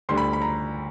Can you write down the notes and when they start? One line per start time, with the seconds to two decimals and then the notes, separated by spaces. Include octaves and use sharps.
0.09 D2 D3 G3 C6
0.17 B5
0.33 B5
0.42 A#5